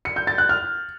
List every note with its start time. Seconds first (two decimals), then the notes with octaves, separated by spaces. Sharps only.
0.05 C#7
0.16 G6
0.27 A6
0.38 F#6
0.49 F6